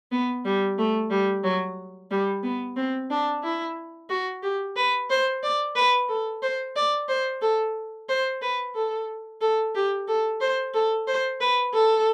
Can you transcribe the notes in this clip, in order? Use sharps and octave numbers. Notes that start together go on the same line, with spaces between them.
B3
G3
A3
G3
F#3
G3
B3
C4
D4
E4
F#4
G4
B4
C5
D5
B4
A4
C5
D5
C5
A4
C5
B4
A4
A4
G4
A4
C5
A4
C5
B4
A4